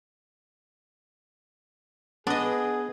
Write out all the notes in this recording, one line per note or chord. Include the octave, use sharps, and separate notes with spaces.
B3 D4 G#4 B4 D#5